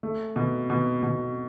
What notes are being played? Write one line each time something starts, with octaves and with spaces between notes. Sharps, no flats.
A3
B2
B2
B2